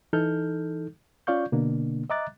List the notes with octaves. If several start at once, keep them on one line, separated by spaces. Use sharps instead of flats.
E3 D#4 A4 F6 G6
C#4 F4 D5 F5 C#6 G6
B2 D3 A#3 D4
D#5 E5 A#5 D6 F#6 A6